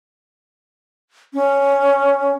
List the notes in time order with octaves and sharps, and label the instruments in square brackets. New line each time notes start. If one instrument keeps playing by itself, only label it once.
[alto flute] C#4